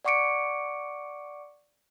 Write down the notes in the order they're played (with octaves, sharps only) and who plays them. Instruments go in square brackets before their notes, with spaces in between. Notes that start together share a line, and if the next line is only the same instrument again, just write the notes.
[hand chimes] D5 F#5 C#6 D6 C#7 D7